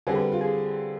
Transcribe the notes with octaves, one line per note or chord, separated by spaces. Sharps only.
D3 G3 C4 G#4
B4
F4
G#4